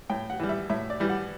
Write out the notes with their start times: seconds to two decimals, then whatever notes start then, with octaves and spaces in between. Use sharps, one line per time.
0.10 A2 G5
0.30 F#5
0.40 E3 G3
0.49 E5
0.70 A2 E5
0.90 D5
1.00 E3 G3
1.09 F#5